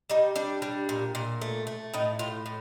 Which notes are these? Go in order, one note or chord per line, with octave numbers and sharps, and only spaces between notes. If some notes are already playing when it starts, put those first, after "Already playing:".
G3 D#4
G3 D4
G3
A#2
A#2
A3
A3
A2 D#4
A2 F4
A2